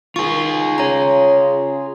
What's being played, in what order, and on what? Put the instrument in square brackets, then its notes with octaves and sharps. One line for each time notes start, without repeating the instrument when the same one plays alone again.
[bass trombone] D#3 [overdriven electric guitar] F4 G#4 [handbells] C#6
[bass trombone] C#3 [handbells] C#5 A#5